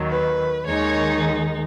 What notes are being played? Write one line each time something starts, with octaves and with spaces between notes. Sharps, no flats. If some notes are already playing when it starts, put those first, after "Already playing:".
Already playing: D#2 D#3 F#3
B4
D#2 D#3 G#3 D#4 C#5